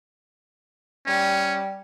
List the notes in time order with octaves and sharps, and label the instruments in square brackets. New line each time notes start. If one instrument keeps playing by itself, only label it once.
[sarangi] G3 [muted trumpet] C#4